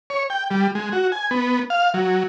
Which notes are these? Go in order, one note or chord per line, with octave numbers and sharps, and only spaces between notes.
C#5
G5
G3
G#3
F#4
G#5
B3
F5
F#3